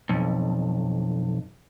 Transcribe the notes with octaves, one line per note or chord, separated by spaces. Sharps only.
B1 F2